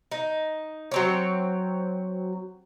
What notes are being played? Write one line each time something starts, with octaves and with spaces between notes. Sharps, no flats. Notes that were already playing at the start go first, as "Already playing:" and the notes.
D#4
F#3 C4 C#5